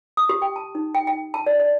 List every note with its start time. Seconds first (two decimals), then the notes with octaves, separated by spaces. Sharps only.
0.17 D#6
0.29 G4
0.42 G5
0.56 A5
0.75 D#4
0.95 G5
1.07 G5
1.34 A5
1.46 D5
1.60 D5